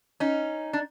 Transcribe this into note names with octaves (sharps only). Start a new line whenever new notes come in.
C#4 D#4
D4